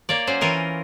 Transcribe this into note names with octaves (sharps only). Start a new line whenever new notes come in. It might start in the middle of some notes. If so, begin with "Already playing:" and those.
A#3 C#5 D5
F#3 C#4 C5
E3 F4 A#4 G#5